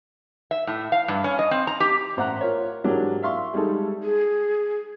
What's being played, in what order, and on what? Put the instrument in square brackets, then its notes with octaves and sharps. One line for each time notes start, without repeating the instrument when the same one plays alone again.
[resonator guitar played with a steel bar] E5
A2
F5
G2
C#4
D#5
C4
A#5
G4
[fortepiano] A1 C5 F#5 A#5 F#6
F4 A#4 C#5
G#2 E3 F#3 D4 G4 A#4
E5 F5 C6 C#6
G3 G#3 D#4 A4
[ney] G#4